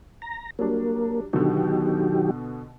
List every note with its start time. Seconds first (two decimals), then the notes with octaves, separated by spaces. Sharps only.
0.22 A#5
0.59 F#3 G3 A#3 D4
1.33 B2 D3 D#3 F#3 G4